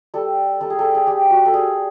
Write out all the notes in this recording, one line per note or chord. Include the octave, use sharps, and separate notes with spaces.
G3 A4
G3 A4
G#4
A4
G#4
G3 G4
F#4
A4
G3 G#4